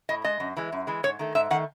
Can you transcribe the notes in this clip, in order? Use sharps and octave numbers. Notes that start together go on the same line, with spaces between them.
A2 D#5
G#3 D#5
F#2
E3 G#3
F#2
E3 G#3
G#2 C#5
D#3 A3
G#2 E5
D#3 A3 F#5